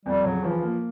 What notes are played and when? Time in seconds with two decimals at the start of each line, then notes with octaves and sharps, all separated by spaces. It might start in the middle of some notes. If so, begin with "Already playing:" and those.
0.05 F2 G3
0.24 C#3 F#3
0.43 E3 F3
0.63 A#3